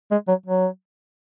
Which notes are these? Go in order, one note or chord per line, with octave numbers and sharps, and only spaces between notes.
G#3
F#3
F#3